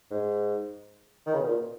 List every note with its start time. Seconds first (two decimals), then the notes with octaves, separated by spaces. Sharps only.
0.11 G#2
1.26 D#3
1.34 C#3
1.41 B2
1.48 A#2